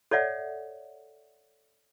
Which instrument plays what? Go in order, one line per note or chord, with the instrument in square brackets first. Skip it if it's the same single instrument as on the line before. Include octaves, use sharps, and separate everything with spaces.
[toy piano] A4 C#5 D5 E5 F#5